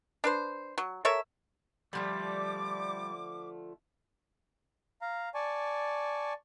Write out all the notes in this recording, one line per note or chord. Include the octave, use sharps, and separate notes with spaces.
D4 B4 C5
F#3
A4 A#4 C#5 E5
D3 F3 G3 A3 D6
F5 A#5
D5 G#5 A5 C#6